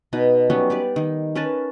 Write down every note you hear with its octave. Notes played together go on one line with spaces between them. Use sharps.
B2 D#4 B4
F#3 G3 B3 C#4
G4 B4 D5
D#3 D#4
C#4 A#4 B4 A5